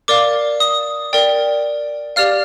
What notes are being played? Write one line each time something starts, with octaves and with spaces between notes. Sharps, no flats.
A#4 D5 F5 D6
D#6
A#4 D5 G5
G4 D5 F5 F6